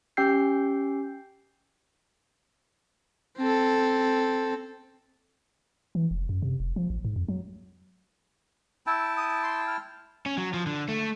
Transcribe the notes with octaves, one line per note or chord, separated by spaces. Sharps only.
C#4 G4 G5 E6 G6 C7
C4 A4
E3
F1
F#2
C3
F1
F3
A1
G#2
F2
F#3
E4 G5 A5 E6
D#6
C6
F6
C#4
F#3
F3
D3
A3